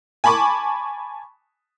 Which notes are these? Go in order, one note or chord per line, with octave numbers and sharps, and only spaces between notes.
G#5 A5 B5 C#6 D6